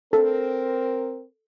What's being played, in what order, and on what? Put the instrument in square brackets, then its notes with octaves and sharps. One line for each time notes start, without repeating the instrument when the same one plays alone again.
[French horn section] C4 A#4 [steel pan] A4